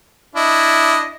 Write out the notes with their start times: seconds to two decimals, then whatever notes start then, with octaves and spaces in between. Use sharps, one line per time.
0.36 D4 E4 D#5